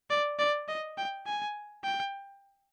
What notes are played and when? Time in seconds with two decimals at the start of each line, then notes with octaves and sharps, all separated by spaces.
0.10 D5
0.39 D5
0.68 D#5
0.97 G5
1.26 G#5
1.84 G5